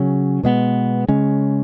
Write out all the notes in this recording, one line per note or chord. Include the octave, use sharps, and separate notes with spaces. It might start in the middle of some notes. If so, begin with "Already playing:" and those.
Already playing: C#3 F#3 C#4
B2 G#3 B3
C#3 G#3 C#4